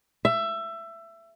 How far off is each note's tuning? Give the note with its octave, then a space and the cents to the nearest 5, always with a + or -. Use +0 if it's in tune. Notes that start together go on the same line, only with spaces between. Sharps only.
E5 +20